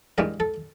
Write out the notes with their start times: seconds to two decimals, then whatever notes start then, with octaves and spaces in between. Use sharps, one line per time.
0.18 G2 E3 G#3 A#4
0.40 A4